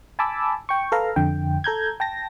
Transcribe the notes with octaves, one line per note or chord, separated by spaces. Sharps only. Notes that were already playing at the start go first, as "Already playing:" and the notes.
G#5 A5 B5 D6 E6
G5 C#6
A4 B4 F5 A#5
F2 D3 G5
A4 A#5 G6 G#6
G5 A5 A#6